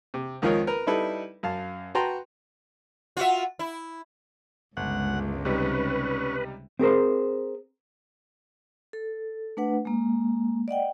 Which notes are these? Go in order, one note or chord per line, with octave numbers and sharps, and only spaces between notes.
C3
C#2 D#3 F3 F4 A#4 C#5
A#4 B4 A#5
G3 D#4 E4 A4 B4
F#2 F5 A5
F#4 B4 G5 A5 A#5 C6
F4 F#4 E5
E4
G1 C#2 F#5
C3 G3 C#4 D#4 B4
C4 G#4 A#4 C5
A4
A3 D4 B4 F#5
G#3 A#3
D5 D#5 F#5 G5